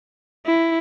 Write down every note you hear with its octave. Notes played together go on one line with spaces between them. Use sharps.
E4